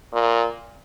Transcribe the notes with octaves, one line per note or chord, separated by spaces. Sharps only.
A#2